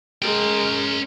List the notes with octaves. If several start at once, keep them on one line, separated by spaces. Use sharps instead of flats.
G#3 C#4 A#4 G5